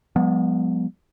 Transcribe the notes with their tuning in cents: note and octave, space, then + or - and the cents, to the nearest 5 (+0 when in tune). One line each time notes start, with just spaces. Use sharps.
F3 +45 G#3 -35 B3 +0